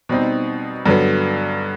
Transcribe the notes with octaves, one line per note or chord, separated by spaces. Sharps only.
B2 G3 C4 D#4
G2 D3 F#3 B3